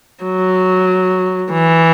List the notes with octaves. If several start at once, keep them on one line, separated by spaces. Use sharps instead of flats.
F#3
E3